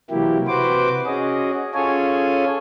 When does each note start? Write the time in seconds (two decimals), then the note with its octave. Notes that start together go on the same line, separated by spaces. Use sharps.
0.10 C3 E3 F#3 A#3 E4 G4
0.48 C3 F#4 B4 C5 D6
1.06 C#4 F#4 G#4 D#5
1.74 C#4 F4 G#4 A4 C#5 G#5